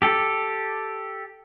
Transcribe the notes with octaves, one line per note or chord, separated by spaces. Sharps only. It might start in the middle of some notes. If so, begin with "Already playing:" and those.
G4 A4